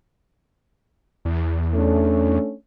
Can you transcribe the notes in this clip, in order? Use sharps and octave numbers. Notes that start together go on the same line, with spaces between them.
E2
A3 C#4 D4